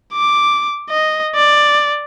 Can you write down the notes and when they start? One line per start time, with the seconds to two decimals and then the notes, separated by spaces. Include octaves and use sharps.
0.13 D6
0.90 D#5
1.35 D5